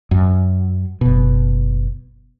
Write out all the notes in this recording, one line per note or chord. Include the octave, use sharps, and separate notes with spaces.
F#2
F#1 B2